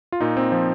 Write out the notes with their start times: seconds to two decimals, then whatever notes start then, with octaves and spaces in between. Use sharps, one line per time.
0.12 F4
0.21 A#2 D#4
0.37 C4
0.52 F3